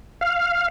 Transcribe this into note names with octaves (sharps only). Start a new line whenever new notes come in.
F5